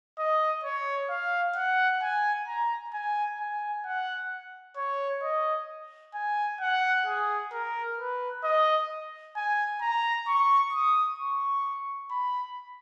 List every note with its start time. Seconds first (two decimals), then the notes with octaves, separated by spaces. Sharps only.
0.18 D#5
0.64 C#5
1.10 F5
1.56 F#5
2.02 G#5
2.47 A#5
2.93 G#5
3.39 G#5
3.85 F#5
4.77 C#5
5.23 D#5
6.14 G#5
6.60 F#5
7.06 G#4
7.52 A#4
7.98 B4
8.43 D#5
9.36 G#5
9.81 A#5
10.27 C#6
10.73 D#6
11.19 C#6
12.11 B5